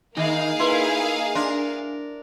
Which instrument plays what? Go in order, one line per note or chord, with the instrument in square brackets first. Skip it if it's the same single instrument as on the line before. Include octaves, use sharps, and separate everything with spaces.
[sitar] D#3 [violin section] A#3 G#4 F5 [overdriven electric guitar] D#4
[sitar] E4 [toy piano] B4 G#5 C6
[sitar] D4 A#4 [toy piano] C6